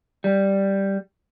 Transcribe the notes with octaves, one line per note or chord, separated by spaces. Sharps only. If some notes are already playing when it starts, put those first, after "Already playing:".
G3